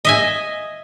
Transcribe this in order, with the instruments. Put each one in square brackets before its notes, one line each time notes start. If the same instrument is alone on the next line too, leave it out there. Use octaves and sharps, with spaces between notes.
[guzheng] D#5 E5 G#5